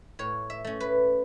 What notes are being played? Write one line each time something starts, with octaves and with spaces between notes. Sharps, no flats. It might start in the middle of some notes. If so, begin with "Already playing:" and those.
A2 C#5
E5
A3 C#4
B4